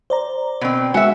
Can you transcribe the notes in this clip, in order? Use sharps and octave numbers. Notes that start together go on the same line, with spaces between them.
C5 D5 A#5
B2 C4
G#3 F#4 E5 G#5